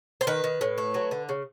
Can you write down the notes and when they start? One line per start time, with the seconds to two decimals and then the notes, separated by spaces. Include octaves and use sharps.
0.21 C5
0.27 D#3 B4
0.44 D#3
0.61 A2
0.78 A3
0.94 F#3
1.11 D3
1.29 C#3